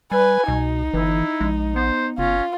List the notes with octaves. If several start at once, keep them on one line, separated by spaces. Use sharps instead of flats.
G3 B4 G#5
C2 B2 D#4
G1 E3 E4
A#1 G#3
B3 C5
F#1 C#4 F4